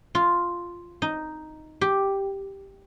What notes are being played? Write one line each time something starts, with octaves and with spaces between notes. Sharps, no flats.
F4
D#4
G4